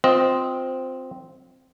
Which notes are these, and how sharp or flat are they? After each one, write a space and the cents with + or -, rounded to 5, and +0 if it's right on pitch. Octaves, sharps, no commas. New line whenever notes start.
C4 -5 F4 +25 D#5 +10